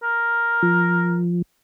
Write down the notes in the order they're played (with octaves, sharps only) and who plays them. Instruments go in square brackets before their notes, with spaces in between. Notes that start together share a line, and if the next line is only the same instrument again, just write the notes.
[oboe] A#4
[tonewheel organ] F3